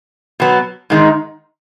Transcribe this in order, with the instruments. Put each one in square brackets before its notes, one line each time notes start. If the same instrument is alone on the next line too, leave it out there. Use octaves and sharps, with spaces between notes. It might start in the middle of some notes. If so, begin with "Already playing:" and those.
[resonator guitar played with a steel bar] B2 F#3 B3
G#2 D#3 G#3 D#4